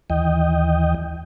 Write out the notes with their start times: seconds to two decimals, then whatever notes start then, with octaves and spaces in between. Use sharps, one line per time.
0.10 D#2 E3 D#5 G5